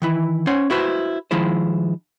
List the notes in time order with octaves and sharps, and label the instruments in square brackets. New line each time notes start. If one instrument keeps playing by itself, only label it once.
[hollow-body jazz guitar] D#3 E3 E4
C#4 C5 C#5 F#5
E4 F#4 B4 C5
D#3 F3 G#3 E4 C5